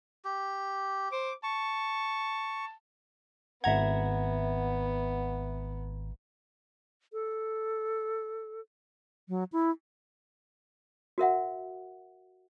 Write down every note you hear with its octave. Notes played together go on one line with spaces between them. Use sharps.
G4
C5 D6
A5 C#6
G#1 B3 E5 F#5 A#5 G#6
A4
F#3
E4
F#4 A#4 E5 F#5